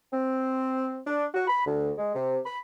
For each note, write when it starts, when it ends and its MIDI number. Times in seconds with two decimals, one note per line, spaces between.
0.12 0.97 60
1.07 1.25 62
1.35 1.45 66
1.48 1.65 83
1.66 1.91 38
1.98 2.14 56
2.15 2.38 48
2.45 2.58 83